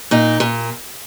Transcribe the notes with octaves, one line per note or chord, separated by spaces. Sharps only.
A#2 D#4
A#2